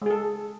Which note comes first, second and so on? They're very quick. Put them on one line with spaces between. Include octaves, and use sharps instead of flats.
G#3 G#4 A4